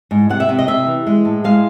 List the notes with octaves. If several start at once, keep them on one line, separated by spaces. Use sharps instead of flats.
G#2
C3 F#5
E5
C3
D#5
C3 E5
E3
G#3
A2
G#3 F5